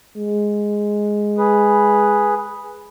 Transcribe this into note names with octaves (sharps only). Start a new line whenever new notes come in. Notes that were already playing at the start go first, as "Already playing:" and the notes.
G#3
G#4 B4